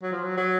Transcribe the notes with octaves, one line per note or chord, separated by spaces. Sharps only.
F#3
F3
F#3
F#3